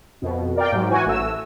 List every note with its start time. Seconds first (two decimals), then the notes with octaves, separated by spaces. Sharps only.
0.22 F2 B2
0.56 A#4 D5 F5 G5
0.72 G#2 F#3
0.90 E3 F#4 G#5
1.06 A1 A3 E6